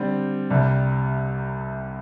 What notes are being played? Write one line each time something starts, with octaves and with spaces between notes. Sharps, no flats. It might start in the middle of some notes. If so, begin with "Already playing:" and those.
Already playing: D3 G3 C4
C2 C3 G3